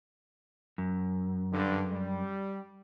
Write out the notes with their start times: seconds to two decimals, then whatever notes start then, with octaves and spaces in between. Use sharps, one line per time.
0.78 F#2
1.52 G2 D3
1.91 G3